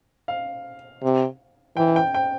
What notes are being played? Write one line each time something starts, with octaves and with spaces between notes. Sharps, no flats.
F5
C3
E3 G5
G5
G5